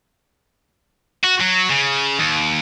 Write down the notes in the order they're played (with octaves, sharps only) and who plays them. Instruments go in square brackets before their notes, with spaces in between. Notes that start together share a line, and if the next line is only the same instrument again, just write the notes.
[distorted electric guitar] F#4
F#3
C#3
D#2